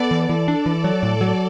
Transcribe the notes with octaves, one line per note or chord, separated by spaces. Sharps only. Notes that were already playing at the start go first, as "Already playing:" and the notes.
Already playing: B3 A4 D5
E3
E3 A4 D5
D4
E3
F#3
A2
F#3